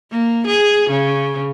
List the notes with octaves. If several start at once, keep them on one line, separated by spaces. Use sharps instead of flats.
A#3
G#4
C#3